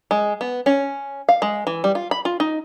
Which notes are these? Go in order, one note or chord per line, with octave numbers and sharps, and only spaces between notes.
G#3
B3
C#4
F5
G#3
E3
G3
F4
B5
F4
D#4